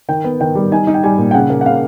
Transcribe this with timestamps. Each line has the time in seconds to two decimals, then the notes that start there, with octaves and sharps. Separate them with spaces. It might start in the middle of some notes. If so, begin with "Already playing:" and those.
0.09 D#3 G5
0.24 B3
0.41 D#3 G5
0.55 G3
0.72 D#4 G#5
0.87 D#4
0.94 G5
1.03 G3 G#5
1.18 A#2
1.31 G5
1.34 C#3 F#5
1.50 A#3
1.61 F#5
1.65 C#3 F5